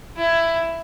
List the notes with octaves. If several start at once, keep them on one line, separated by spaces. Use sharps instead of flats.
E4